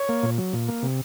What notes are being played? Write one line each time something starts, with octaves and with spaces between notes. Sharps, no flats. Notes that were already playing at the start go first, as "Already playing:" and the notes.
Already playing: C#5
A#3
A#2
F#3
A#2
A#3
C3